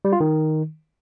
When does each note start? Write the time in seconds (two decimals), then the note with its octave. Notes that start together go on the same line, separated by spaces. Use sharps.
0.05 G3
0.12 F4
0.20 D#3